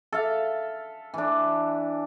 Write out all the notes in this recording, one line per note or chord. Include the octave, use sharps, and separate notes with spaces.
A4 E5 F5
E3 D4